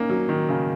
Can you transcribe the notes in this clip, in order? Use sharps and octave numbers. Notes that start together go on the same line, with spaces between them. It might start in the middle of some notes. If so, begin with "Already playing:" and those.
Already playing: A#3 C#4 D#4
F#3
D#3
C#3